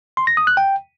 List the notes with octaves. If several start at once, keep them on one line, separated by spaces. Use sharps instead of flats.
C6
A#6
D#6
F#6
G5